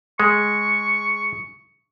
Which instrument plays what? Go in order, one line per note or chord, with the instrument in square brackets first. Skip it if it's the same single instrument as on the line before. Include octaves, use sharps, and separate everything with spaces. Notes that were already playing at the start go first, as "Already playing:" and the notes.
[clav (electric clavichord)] G#3 [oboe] C#6